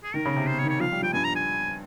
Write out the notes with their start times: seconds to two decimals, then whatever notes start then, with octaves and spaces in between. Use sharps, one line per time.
0.04 G#4
0.14 D#3 A#4
0.25 C#3
0.36 C3
0.47 C5
0.59 C#5
0.64 D#3
0.69 C#5
0.80 F3 F5
0.92 G3
1.02 F3 G5
1.13 G2 G#5
1.24 A#5
1.35 G#5